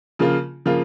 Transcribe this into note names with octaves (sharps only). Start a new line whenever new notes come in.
C#3 F3 A#3 F4
C#3 F3 A#3 F4